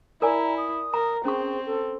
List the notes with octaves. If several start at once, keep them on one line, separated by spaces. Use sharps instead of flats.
E4 A#4 D5 G#5 A#5
D#6
A#4 A#5
C4 C#4 G#4 C#6
A4